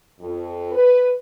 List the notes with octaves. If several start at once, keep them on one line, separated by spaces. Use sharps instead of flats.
F2
B4